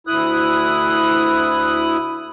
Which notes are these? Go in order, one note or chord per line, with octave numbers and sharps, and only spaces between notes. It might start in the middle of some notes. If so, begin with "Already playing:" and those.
D2 E4 D#6 F#6